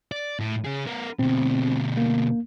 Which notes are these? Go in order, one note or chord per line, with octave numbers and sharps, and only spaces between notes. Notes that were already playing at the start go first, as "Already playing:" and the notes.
D5
A2
C#3 G#4
B3 A#4
D2 B2 C4
A#3